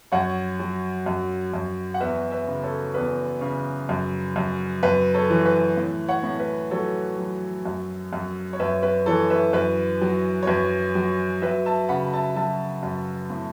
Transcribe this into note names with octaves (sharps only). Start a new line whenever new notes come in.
F#2 C#5 F#5
F#3
F#2
F#2
F#5
E2 B4 E5
B4 E5
C#3
A4 C#5
E2 B4
C#3
F#2
F#2
F#2 B4
A4 C#5
E3
B4
A2
C#5 F#5
A2
B4
F#3 A4 C#5
F#3
F#2
F#2
C#5
F#2 B4 E5
B4
E3 A4 C#5
B4 E5
F#2 B4
F#3
C#5
F#2 B4
F#3
F#3 B4 E5
E5 A5
C#3 F#5 B5
E5 A5
F#3 E5 A5
F#2
A2